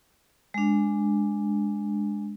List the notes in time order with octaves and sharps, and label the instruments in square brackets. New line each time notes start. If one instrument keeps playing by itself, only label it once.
[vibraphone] G#3 D4